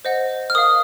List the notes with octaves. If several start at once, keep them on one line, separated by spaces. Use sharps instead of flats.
C5 D#5 F#5
F6
A#4 F5 D#6